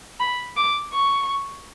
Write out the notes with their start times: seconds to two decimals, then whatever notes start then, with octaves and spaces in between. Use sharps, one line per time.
0.20 B5
0.57 D6
0.93 C#6